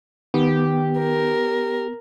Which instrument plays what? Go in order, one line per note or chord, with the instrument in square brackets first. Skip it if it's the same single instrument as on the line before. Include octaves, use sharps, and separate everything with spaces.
[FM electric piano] D#3 [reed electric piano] B3 [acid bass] G4
[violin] A#4